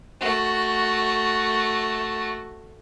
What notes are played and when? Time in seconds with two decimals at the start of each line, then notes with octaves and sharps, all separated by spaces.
0.20 A3 F#4